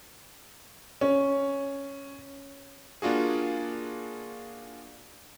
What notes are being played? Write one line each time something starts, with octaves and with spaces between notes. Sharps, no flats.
C#4
A#3 D4 F4 F#4 G#4